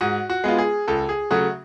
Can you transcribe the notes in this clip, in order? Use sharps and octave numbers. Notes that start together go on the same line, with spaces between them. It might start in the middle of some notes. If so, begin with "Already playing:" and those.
G#2 F#4
F#4
G#3 B3 F4
G#4
C#2 A4
G#4
C#3 F#3 A3 F#4